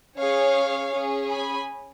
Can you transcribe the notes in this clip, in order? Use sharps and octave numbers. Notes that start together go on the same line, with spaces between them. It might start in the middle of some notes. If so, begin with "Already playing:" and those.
C#4 G#4 C#5 F5
C#4 G#4
G#5 B5